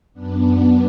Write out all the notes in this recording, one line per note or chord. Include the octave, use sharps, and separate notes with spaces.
F#2 B3 D4